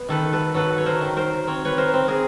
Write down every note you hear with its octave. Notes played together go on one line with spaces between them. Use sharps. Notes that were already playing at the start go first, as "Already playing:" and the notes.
Already playing: B3
D#3 A4 B4
A4 B4
F#3 A4 B4
C#5
A#4 C5
D#3
A#4 C5
C4 C#5
B4 C#5
A#4 C5
C4
G#4 A#4